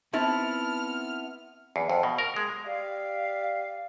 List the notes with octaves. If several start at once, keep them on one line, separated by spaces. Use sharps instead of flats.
B3 C4 D#4 E4 A5 F6
E2
F2
B2
A#4
G#3
G4 D5 E5 F5